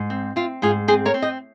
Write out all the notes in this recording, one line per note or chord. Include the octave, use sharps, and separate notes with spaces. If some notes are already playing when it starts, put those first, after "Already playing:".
Already playing: G#2
C4
C4 F4
G#2 F4 G#4
C4 G#4 C5
A#4 C#5
C4
D#5 G5